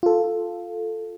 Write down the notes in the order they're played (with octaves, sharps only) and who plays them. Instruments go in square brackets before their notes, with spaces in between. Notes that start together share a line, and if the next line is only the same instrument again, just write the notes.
[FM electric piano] F4 A4